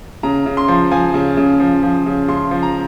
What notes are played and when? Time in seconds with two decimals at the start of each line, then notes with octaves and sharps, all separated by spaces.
0.23 C#3 A#5
0.46 C#3
0.57 C6
0.68 F3
0.91 F3 G#5
1.14 C#3
1.37 C#3
1.60 F3
1.83 F3
2.06 C#3
2.28 C#3 C6
2.51 F3
2.63 A#5